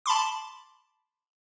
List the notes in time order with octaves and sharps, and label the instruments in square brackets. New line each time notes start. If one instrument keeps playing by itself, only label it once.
[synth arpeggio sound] A5 B5 C6 D6